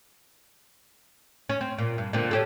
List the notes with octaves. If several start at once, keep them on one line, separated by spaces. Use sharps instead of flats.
C#4
C4
A#2
G2
A#2 D3 C4
C#4 G4 A4